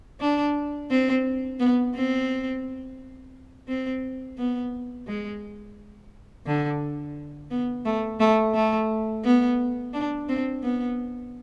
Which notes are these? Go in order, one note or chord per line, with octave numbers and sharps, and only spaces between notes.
D4
C4
B3
C4
C4
B3
G#3
D3
B3
A3
A3
A3
B3
D4
C4
B3